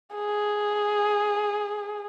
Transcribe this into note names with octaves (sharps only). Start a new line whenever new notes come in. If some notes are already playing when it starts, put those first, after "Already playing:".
G#4